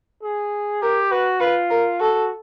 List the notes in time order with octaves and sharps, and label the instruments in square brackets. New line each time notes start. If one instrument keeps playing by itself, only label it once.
[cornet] G#4
[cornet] G4 [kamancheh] A#4
[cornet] F#4 [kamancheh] B4
[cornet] F4 [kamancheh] B4
[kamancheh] A#4
[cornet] F#4 [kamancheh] A4